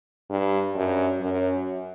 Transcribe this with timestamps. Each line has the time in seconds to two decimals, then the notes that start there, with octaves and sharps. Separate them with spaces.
0.30 G2
0.76 F#2
1.20 F#2